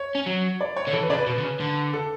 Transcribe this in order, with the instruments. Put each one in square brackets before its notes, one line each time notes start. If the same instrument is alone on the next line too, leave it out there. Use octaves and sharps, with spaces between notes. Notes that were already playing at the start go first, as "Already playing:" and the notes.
Already playing: [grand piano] C#5
[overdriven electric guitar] C#4
F#3
[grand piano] D5
C#5
[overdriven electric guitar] D3
[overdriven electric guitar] E3 [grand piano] A4
[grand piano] B4
[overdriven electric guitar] C#3 [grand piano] D5
[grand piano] B4
[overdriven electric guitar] B2
D3
C#3
D3
[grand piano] A4